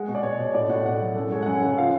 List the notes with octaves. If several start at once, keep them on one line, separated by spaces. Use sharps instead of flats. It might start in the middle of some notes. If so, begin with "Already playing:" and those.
Already playing: G#3 F#5
B2
D5
B2 C#5
B2 C#5
A2 D5
A2 F#5
A2 F#5
F#3
F#2 A4
G#3 C#5
F#5
F#2 G#5
C#3 F#5
F3 F5